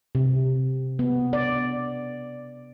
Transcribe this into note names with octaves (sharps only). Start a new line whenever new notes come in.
C3
B3
D5